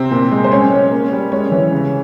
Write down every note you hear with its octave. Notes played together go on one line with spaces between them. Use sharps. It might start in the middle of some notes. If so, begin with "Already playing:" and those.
Already playing: C3 C4
A#2
G#3
C5
G#3 C#4 C#5
G#3
A#3
G3
G#3 C#4 C#5
E3
C#3